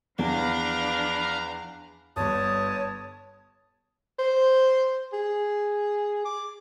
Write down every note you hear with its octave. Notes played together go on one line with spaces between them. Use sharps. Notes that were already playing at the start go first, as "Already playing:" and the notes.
E2 F3 D4 B4 F5 A#5
G1 G2 C#5 A5 D#6
C5
G#4
D6